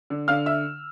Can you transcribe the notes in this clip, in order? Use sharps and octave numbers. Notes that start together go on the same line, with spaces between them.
D3
D3 F5 F6
E5 E6